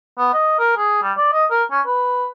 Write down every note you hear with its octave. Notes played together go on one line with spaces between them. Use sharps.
B3
D#5
A#4
G#4
G3
D5
D#5
A#4
C#4
B4